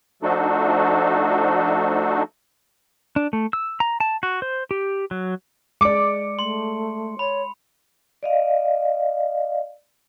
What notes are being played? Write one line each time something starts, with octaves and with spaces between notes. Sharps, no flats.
F3 A3 D4 D#4 F#4 A4
D4
A3
E6
A#5
A5
F#4
C5
G4
F#3
G#3 D5 D6 C#7
A3 C6
C#5 B5
D5 D#5 F5